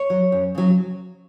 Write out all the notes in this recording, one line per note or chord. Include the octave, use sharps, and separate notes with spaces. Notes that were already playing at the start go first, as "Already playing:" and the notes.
Already playing: C#5
F#3
F#2
C#3 F#3